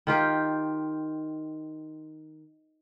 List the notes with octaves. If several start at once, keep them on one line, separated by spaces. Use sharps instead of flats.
D#3 F4 G4